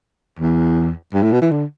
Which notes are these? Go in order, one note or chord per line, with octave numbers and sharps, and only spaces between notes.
E2
G2
A2
B2
E3
D3